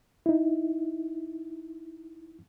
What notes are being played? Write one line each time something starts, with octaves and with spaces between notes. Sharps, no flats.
D#4 E4